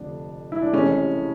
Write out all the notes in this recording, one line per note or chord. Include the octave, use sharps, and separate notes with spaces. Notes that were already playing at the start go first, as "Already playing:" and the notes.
Already playing: F1 F2 D3 F3 D4
E4
D4
F1 F2 C#3 E3 G3 C#4